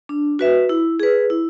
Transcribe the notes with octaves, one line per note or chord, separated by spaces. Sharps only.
D4
F#4 B4 E5
E4
G#4 B4
E4